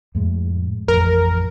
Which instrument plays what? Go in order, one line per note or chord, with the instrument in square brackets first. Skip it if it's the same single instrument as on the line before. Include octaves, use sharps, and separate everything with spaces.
[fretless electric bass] F2 A2 G#3
[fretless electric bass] A1 F2 [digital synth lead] A#4